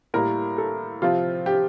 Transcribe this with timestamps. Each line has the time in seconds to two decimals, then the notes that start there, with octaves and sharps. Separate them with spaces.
0.14 A2 G3 A#3 A#4
0.58 A4
1.02 C3 F3 C4 F4
1.46 G4